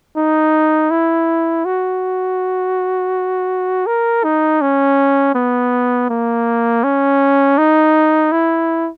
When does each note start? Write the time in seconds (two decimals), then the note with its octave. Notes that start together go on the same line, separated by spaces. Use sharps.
0.16 D#4
0.90 E4
1.65 F#4
3.87 A#4
4.24 D#4
4.61 C#4
5.35 B3
6.10 A#3
6.83 C#4
7.58 D#4
8.32 E4